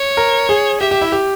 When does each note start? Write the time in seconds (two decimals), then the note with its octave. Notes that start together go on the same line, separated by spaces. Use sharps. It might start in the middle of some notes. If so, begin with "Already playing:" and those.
Already playing: C#5
0.17 A#4
0.49 G#4
0.81 G4 E5
0.91 G4
1.01 E4
1.12 G4